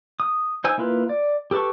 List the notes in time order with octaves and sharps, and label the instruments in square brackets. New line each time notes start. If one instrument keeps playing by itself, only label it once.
[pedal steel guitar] D#6
D#4 C5 G#5 E6
A#3 E4 F4 B4
D5
G4 A4 B4 A5 C#6